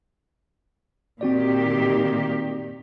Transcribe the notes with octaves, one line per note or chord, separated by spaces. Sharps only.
A#2 D#3 C4 F#4 G4 D5